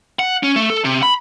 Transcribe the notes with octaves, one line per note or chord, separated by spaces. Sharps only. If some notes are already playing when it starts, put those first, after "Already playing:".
F#5
C#4
A3
A4
C3
B5